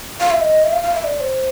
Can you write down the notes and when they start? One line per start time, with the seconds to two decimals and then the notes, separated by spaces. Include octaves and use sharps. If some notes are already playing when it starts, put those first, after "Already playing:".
0.20 F5
0.31 E5
0.41 D#5
0.64 E5
0.73 F5
0.83 F5
0.94 E5
1.04 D5
1.20 C5